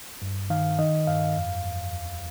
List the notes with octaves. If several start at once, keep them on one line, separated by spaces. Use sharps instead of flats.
G2
D#3 F5
D#3 D#5
G2 F5
F2
F2
D#2